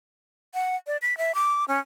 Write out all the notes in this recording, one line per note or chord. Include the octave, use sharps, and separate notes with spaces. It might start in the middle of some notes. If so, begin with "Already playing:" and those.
F#5
D5
B6
E5
D6
C#4